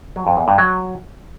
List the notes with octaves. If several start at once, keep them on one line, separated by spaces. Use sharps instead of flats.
F#3
F2
E2
G2
F#3